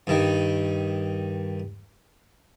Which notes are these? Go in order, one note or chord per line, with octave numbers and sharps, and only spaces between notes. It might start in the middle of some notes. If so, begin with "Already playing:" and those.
G2 D#3